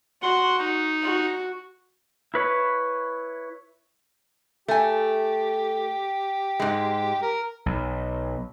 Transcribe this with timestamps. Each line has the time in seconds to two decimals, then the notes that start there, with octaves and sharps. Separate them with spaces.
0.22 F#4 F#5 C6
0.58 D#4
1.04 F#4
2.34 E4 B4 C#5
4.68 A3 G4 G#5
6.60 G#2 G#3
7.22 A#4
7.66 B1